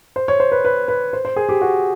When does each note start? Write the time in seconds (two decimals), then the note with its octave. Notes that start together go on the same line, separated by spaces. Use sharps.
0.16 C5
0.28 C#5
0.40 C5
0.52 B4
0.65 B4
0.88 B4
1.13 C5
1.25 C5
1.36 G#4
1.49 G4
1.62 F#4